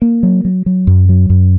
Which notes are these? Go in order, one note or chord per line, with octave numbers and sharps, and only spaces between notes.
A#3
F#3
F#3
F#3
F#2
F#3
F#2